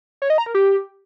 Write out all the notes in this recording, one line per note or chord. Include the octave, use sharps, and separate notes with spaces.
C#5
D#5
A#5
A#4
G4